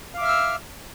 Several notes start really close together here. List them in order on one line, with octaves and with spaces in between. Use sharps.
F5 D6 E5 F6 E6